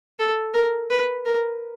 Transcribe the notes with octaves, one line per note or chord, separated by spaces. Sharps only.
A4
A#4
B4
A#4